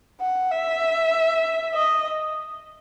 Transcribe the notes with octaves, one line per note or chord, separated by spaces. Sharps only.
F#5
E5
D#5